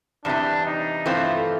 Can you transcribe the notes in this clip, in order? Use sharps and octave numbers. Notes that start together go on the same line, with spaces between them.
E2 C3 E3 G3 D4
D#4
G2 E3 A3 C4 F4